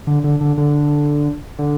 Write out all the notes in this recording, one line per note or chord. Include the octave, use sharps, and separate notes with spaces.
D3
D3
D3
D3
D3